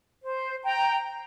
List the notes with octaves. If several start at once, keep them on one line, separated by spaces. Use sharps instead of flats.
C5
G5 A#5